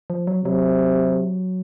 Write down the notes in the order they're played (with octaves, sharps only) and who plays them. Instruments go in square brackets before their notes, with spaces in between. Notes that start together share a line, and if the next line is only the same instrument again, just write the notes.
[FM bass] F3
F#3
[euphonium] C3 [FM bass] F#3